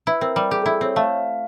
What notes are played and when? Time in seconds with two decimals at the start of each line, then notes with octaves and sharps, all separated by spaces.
0.07 E4 B4
0.21 C4 A#4
0.36 G3
0.51 G4 G#4
0.62 E4 A4
0.81 C4 C#5
0.96 A3 F5